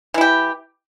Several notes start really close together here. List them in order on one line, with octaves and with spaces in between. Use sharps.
E3 E4 G4